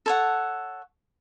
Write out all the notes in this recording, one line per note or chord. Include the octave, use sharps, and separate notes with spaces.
A4 C#5 F#5